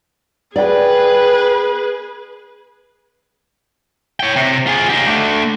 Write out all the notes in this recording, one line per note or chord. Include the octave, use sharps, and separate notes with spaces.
G#4 B4 D5 G5
C#5 G5
C3
F4 G#4
D#4 G4
A3 D4